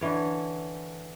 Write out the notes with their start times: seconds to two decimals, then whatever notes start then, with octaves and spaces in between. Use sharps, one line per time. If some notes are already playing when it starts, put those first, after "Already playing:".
0.01 D3 E3 C#5